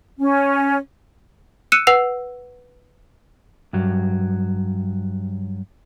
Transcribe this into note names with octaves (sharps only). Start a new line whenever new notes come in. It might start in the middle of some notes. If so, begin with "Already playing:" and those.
C#4
E6 F#6 C#7 D#7 E7
B4 F#5 E6 C7 F7
G2 F#3